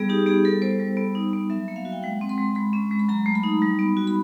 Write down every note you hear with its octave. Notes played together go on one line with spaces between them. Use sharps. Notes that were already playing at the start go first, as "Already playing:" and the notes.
Already playing: G3 B3 G#4
D#4 G4
B3 G#4
G3 A4
B3 C5
G3
B3
D#4
B3
F#3 E5
A#3
F5
F#4
G5
G#3 F#5
C4
C6
G#3
G#3 B5
C#4
G#3
B5
F#3 A#5
A3
B5
D#4
G3
B3
F#4
B5